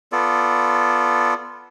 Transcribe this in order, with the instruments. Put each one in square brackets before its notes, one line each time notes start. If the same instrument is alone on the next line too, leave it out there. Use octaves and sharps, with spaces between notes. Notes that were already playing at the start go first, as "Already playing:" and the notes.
[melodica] B3 F4 A4 D5